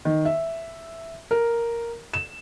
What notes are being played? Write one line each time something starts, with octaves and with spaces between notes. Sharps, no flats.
D#3
E5
A#4
E7